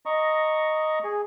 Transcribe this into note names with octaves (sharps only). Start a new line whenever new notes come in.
D#5 A#5 C#6
G#4